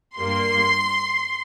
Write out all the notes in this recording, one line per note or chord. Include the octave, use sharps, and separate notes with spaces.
G2 G3 A#3 C6